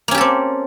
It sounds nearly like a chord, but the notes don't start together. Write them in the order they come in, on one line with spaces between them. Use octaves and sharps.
A#3 C#4 G4 A4 C4